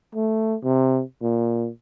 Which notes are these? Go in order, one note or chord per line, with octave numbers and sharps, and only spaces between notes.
A3
C3
A#2